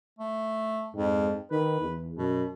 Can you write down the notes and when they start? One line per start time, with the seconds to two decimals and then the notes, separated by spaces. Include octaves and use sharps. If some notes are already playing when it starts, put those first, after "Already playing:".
0.19 A3
0.94 F2 G#2
1.51 D#3 B4
1.81 E2
2.17 F#2 B2